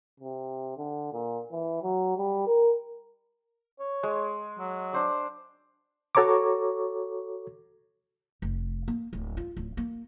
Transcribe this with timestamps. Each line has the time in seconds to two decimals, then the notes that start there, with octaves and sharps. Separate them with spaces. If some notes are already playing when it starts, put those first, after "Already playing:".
0.20 C3
0.77 D3
1.13 A#2
1.51 E3
1.83 F#3
2.17 G3
2.47 A#4
3.79 C#5
4.03 G#3
4.58 F#3
4.93 D4 C5 D5
6.15 F#4 A4 C#5 A#5 C#6 D6
8.42 F1
8.88 A#3
9.13 D1
9.37 F4
9.57 D1
9.77 A#3